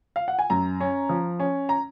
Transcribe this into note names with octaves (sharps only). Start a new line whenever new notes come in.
F5
F#5
G#5
F#2 A#5
C#4
F3
C#4
A#5